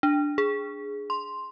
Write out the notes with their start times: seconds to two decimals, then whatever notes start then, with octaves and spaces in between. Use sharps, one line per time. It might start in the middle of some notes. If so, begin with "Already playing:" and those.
0.03 D4
0.38 G#4
1.10 C6